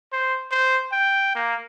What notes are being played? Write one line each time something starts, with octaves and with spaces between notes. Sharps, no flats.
C5
C5
G5
A#3